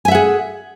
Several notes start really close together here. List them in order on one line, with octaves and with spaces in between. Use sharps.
G#5 E5 F#5 G#4